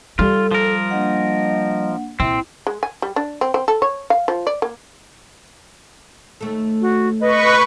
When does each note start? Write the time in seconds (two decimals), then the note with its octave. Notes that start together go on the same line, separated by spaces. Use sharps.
0.19 G3 F4 A4
0.51 F3 A#4
0.90 A#3 D4 D#5 F#5
2.20 A#1 C4 E4 E5
2.67 G#3
2.83 G#5
3.02 G3
3.16 D4
3.41 C4
3.54 C4
3.68 A4
3.82 C#5
4.10 F5
4.28 F3
4.47 D5
4.62 A#3
6.41 D#2 A3 A4
6.81 F#4
7.21 B4 D#5 C#6